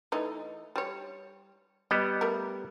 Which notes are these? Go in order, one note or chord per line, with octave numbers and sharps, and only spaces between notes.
E3 A3 D#4
G3 C#5
G3 B3 D#5
A3 A#4